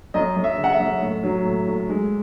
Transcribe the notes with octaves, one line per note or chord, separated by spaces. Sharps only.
F#2 D#5
F#2
E5
C#3
F#5
E5
F#2
A2
F#3
A2
A2
G#3